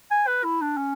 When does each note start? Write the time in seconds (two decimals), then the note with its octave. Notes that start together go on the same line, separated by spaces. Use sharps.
0.11 G#5
0.27 B4
0.44 E4
0.61 D4
0.77 C#4